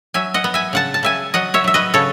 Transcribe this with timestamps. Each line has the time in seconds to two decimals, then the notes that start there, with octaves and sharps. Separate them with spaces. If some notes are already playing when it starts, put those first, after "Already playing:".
0.14 F#3 E5 G#5
0.34 D#5 F#5
0.44 B3
0.54 E5 G#5
0.73 C#3 F#5 A5
0.94 A5
1.03 C#3 E5 G#5
1.34 F#3 D#5 F#5
1.54 C#5 E5
1.64 F#3 E5
1.74 B4 D#5
1.94 C#3 A4 C#5